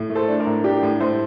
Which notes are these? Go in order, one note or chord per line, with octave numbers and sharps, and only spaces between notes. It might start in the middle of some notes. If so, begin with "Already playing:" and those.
Already playing: A2
A3
A4 C5
D4
A#4 D5
A2
D4 G4 A#4
A2
A2 A4 C5